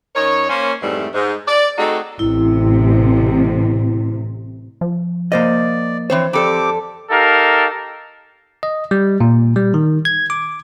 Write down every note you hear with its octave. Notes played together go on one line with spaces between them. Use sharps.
F#2 D#4 A#4 C#5
A#3 C#4 C5
F2 G#2 E3 G3 A3
G#2
D5
A3 C4 D#4 F#4 G#4 A4
A1 C3 E4
F3
A#3 C5 D5 D#5
E3 C4 C5 C#5
F2 C4 G4 A4 D5 D6
D#4 G4 A4 A#4 F5
D#5
G3
A#2
G3
D#3
G#6
D6